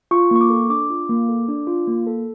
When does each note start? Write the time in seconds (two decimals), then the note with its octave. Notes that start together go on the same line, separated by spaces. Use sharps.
0.11 F4 C#6
0.31 A#3 C#6
0.41 D6
0.50 A4
0.69 D4 D6
0.90 F4
1.09 A#3
1.29 A4
1.48 D4
1.67 F4
1.87 A#3
2.07 A4